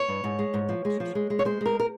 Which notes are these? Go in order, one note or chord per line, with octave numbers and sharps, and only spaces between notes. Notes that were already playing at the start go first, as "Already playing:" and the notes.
Already playing: C#5
G2
G#2
G#3
G#2
F3
G#3
F3
G#3
G#3
C#5
G#3 C5
G#3 A#4
A#4